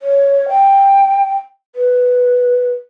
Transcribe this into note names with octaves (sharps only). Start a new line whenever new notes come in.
C#5
G5
B4